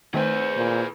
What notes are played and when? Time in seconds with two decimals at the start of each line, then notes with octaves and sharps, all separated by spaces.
0.14 D#3 A3 C4 G#4 B4 C5
0.57 A#2